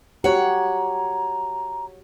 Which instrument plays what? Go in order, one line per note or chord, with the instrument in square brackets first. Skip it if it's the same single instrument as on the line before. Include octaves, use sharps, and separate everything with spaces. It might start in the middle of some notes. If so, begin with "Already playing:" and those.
[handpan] F#4 G4 [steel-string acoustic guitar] C#5 F#5 [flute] A#5